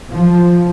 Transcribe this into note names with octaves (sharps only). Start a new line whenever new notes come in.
F3